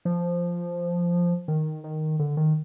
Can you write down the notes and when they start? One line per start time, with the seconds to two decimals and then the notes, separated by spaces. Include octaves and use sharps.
0.05 F3
1.48 D#3
1.84 D#3
2.19 D3
2.37 D#3